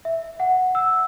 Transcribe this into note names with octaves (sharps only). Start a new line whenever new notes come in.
E5
F#5
E6